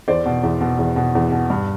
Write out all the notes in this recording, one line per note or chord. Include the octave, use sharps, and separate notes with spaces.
E2 C5 D5
B2
E2
B2
E2
B2
E2
B2
G2